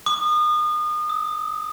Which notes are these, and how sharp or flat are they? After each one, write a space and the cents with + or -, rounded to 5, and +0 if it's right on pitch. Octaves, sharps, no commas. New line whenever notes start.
D#6 -35
D#6 +35